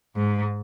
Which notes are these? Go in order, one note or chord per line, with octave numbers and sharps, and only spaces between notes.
G#2